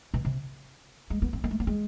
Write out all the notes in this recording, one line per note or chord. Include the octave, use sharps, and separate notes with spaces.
B2
C3
G#3
B3
C4
B3
A3
B3
G#3